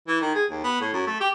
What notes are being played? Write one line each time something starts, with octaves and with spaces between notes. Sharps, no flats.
E3
D#3
G#4
D#2
B3
A2
F#2
A3
G4